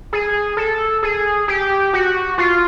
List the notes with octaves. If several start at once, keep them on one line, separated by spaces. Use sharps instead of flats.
G#4
A4
G#4
G4
F#4
F4